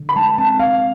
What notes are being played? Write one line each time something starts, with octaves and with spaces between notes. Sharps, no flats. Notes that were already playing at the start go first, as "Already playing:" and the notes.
Already playing: D3
B5
G#3 A5
C4 A5
C4 F5